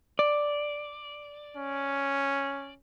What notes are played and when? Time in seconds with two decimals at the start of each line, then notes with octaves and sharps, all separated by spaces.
0.19 D5
1.57 C#4